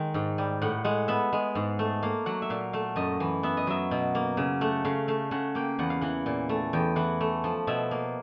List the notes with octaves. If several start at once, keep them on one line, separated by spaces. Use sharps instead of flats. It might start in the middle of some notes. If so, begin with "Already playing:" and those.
Already playing: D#3 G#3 F5
G#2
G3
A2 F#5
G#3 F#5
B3 E5
G#3
G#2
A3
A#3 F5
F#3 F#5
E5
A#2 F5
A3 F5
F#2 D#5
E3
B3 E5
D#5
F#3 E5
B2
A#3
C#3
A3 F#5
C#3 F5
A3 F5
C#3 F#5
A#3 G5
E2 F#5
F5
E3 F#5
A#2
A3
E2 G5
E3 F#5
A3
F3
B2 E5
A#3